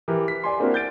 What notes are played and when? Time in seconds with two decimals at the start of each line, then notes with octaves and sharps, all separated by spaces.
0.08 E3 G4 A#4
0.28 B6
0.44 D5 G#5 C6
0.60 A#3 C4 D4 E4 F#4 A#4
0.74 G6 A6 D7